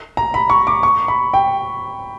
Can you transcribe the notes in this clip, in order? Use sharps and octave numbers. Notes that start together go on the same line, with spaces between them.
A#5
B5
C#6
D6
C#6
B5
G5